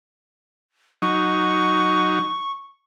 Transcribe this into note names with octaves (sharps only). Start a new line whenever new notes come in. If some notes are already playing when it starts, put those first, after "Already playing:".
F#3 D#4 C#6